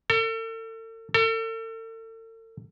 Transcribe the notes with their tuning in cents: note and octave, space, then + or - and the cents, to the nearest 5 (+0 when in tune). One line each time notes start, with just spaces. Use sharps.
A4 +40
A4 +40